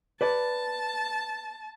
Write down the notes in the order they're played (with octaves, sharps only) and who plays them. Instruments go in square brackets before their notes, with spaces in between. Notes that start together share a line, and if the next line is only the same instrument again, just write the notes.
[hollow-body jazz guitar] B4 D5 [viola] A5